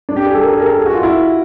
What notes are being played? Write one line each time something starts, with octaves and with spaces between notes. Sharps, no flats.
D4
G4
G#4
A4
A#4
G#4
A#4
A4
G#4
F#4
F4
E4